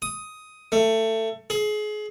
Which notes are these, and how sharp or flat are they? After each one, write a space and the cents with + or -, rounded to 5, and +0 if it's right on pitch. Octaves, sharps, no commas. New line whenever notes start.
D#6 +10
A3 +20
G#4 +30